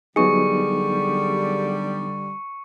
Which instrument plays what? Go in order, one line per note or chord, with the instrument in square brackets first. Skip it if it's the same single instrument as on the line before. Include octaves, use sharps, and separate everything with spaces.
[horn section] D3 G3 [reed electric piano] F#3 B3 D#4 [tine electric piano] G#4 [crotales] C#6 C#7